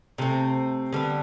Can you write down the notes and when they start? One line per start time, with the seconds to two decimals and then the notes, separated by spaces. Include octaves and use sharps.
0.18 C3 E3 A3 C4
0.92 D3 G3 B3